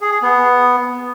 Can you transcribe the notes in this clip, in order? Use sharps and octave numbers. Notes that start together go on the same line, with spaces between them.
G#4
G#4
B3